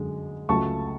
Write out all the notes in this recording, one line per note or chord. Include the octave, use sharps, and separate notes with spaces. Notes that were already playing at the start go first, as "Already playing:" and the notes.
Already playing: F#2 D3 G#3
C#2 C#3 F#3 A3 A5 C#6